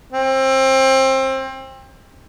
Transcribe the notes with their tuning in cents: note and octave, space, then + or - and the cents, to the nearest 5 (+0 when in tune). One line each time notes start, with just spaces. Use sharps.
C4 +25